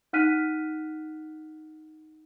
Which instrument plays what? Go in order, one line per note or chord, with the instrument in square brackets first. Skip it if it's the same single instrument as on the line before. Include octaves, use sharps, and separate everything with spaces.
[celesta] D#4 F#5 F6 F#6 B6 D#7